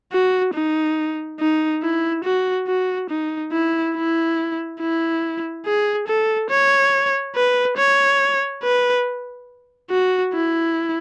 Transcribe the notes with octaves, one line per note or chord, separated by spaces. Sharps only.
F#4
D#4
D#4
E4
F#4
F#4
D#4
E4
E4
E4
G#4
A4
C#5
B4
C#5
B4
F#4
E4